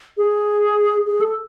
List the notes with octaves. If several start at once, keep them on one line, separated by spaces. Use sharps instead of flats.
G#4
G#4
A4